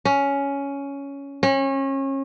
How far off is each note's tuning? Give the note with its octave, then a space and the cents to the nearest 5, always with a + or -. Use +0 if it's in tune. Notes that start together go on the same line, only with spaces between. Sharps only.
C#4 +10
C#4 -30